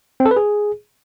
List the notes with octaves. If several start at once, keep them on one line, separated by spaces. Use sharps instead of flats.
C4
A4
B4
G#4